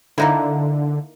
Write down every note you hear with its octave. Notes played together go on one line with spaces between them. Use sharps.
D3 A#3 D#4 E4